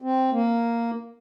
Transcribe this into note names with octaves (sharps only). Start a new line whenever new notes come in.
C4
A#3